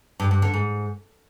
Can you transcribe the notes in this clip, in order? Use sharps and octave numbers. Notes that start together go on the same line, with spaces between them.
G2
G2
D3
G#2